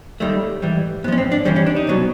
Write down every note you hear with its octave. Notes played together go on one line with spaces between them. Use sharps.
D#2 D#3 G3 A3
G#2 E3 G3
G#2 F3 B3 C#4
C4
D4
G2 E3 G3 C#4
C#4
D4
D#4
C2 B2 F#3